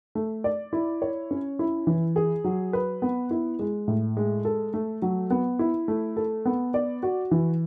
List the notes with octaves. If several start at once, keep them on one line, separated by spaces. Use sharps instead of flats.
A3
D5
E4
C#5
C#4
E4
E3
G#4
F#3
B4
B3
E4
G#3
A2
G#3
A4
A3
F#3
B3
E4
A3
A4
B3
D5
F#4
E3